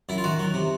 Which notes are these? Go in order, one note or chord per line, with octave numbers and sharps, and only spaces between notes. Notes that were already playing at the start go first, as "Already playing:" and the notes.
F#2 E4
F4
D#3 F#4
F#3
C3